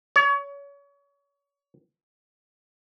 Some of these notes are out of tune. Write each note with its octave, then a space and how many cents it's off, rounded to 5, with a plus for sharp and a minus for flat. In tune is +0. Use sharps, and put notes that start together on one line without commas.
C#5 +30